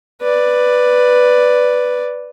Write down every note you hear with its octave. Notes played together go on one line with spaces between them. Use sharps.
B4 D5